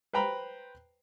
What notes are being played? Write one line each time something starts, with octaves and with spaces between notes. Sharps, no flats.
B4 C5 G5 A#5 B5